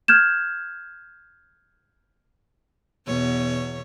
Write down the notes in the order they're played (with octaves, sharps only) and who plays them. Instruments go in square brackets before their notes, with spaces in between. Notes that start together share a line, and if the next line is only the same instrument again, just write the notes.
[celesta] F6 G6 G#6 E7
[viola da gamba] E2 B2 C#5